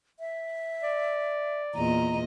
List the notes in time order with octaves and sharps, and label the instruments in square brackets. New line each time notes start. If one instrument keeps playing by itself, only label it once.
[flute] E5
[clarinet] D5
[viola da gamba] E2 A#2 D#5 [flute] A#5